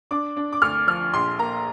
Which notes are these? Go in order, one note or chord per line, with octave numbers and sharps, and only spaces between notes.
D4 D6
D4
D6
D2 F6
F3 F6
A#1 C6
A#3 A#5